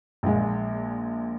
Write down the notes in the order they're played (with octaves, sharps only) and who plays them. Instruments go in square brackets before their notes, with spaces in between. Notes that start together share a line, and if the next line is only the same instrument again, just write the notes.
[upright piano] A#1 A#2 G#3